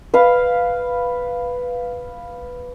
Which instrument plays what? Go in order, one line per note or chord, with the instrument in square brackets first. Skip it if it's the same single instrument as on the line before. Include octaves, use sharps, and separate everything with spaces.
[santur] B4 F5